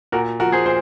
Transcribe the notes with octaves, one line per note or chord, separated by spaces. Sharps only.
A#2 F#4 A#4
F3 F#4 A#4
G#4 C5
A#2 C5